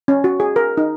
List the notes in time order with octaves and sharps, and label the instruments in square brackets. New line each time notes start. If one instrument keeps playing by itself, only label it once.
[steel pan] C#4
F#4
G#4
A#4
D#4